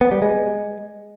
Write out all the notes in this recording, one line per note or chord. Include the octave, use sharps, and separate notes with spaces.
B3
G3
G#3